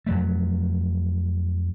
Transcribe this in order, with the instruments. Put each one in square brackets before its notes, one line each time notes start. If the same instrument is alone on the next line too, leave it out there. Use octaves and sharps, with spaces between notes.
[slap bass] F2 F#3 A3